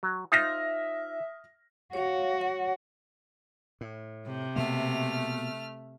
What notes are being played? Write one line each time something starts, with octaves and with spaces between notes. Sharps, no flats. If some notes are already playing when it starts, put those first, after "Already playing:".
F#3
D#4 F4 C5 E5 D#6 F6 A#6
F#4 C#5 F5
C#5 F#5
A2
C3
B2 A3 A#3 F6